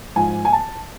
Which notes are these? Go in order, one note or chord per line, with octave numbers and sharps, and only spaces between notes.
G#2 F3 G#5
G#5
A5